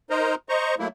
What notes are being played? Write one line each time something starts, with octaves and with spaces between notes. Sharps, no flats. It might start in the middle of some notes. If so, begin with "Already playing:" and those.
D#4 A#4 C5 D#5 A#5
C5 D#5 A#5 C#6
F#3 A3 A#3 E4